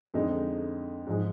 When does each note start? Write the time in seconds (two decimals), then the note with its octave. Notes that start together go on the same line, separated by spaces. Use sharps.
0.14 F2 D3 G#3 D#4
1.06 G#2 F3 G#3 D#4 G#4